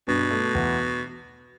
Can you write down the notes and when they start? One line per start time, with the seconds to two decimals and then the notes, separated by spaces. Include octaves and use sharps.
0.08 G2 B2
0.31 A3
0.55 E2